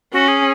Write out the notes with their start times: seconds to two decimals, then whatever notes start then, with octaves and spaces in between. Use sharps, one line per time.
0.13 C#4 F#4
0.28 G#4